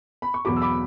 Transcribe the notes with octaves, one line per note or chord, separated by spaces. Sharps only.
B5
C#6
E2 B2 F#3 B5 D6
E6
B5 D6